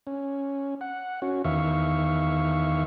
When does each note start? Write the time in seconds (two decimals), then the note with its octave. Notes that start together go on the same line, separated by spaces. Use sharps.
0.07 C#4
0.81 F#5
1.22 C#4 F#4
1.45 E2 D#3 E5 F5 C#6